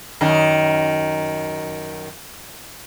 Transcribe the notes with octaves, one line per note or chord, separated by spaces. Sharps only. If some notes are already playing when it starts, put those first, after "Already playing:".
F#2 D#3